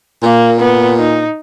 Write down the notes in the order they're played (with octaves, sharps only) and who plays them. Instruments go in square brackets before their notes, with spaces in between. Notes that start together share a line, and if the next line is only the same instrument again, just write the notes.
[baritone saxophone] A#2 [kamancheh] A#3
[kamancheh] B3
D#4